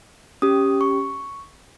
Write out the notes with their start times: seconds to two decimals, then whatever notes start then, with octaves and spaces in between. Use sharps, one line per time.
0.42 C#4 G4 D#6
0.81 C#6